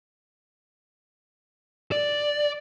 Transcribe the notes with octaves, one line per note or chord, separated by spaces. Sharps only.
D5